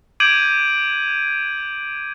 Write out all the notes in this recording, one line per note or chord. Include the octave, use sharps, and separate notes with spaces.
D6 G6 G#6 D7 D#7 F#7